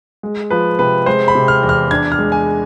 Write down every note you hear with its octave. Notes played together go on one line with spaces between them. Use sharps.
G#3
F3 B4
C3 B4
G#3 C5
B5
C3
F6
E2
F6
D4 G#6
F6
G#3
G#5